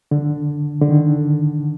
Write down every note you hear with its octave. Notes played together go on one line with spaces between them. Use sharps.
D3
D3
D#3